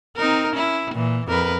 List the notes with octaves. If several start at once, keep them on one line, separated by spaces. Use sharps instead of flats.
C4 D#4 A#4
C#4 E4
A#2 E3
F2 A#4 B4